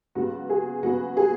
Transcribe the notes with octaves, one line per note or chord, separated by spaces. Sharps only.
C#2 C#3 F#3 B3 F#4
G#4
C#2 C#3 F#3 B3 F#4
G#4